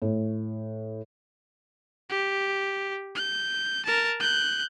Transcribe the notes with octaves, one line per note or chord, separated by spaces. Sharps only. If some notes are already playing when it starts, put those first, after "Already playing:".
A2
G4
G6
A#4 A5
F#6 G6